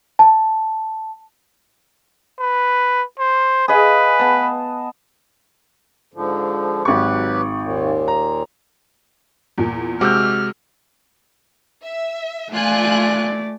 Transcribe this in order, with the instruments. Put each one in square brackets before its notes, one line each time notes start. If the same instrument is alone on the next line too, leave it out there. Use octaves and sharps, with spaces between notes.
[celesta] A5
[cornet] B4
C5
[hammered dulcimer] G#4 D#5 F5 [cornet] B4
[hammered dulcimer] B3 A5
[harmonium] G#2 D3 F3
[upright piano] G#1 C#6 [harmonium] F#3 G4 B4
[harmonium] D#2 A#2
[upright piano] A#5
[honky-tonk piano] E2 A#2
[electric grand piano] C3 G#3 F#4 [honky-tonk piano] D6 E6 G6 [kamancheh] F6
[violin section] E5
[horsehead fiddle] A3 D5 [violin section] F4 G#5 F#6